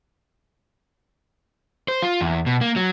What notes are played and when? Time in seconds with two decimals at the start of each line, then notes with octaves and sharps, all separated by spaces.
1.88 C5
2.02 F4
2.21 E2
2.46 B2
2.61 A#3
2.76 F#3